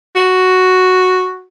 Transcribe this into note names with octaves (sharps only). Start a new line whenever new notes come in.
F#4